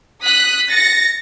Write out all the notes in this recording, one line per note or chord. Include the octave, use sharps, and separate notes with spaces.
D#6 F#6 B6
A6 A#6 C#7